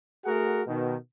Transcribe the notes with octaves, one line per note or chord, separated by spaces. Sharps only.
A3 F#4 G#4 A#4 F#5
B2 D#3